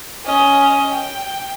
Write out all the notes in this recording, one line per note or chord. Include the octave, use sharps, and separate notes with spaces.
C#4 D#5
G5